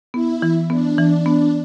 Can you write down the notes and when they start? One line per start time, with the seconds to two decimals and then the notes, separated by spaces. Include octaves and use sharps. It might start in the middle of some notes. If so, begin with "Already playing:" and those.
0.14 B3 E4
0.42 E3
0.70 B3 D4
0.98 E3
1.26 B3